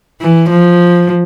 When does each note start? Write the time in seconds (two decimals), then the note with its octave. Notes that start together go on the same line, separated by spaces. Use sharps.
0.21 E3
0.51 F3